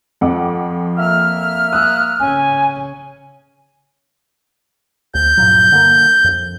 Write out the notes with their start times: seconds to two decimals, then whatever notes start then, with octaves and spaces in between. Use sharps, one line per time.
0.21 F2 F3 F#5 D6
0.98 A#3 E5 F6
1.73 D#6 E6 F#6
2.20 C#3 C#4 G#5
5.15 D2 G6
5.37 G2 A#2 F#3
5.72 D3 A3 A#3
6.24 F2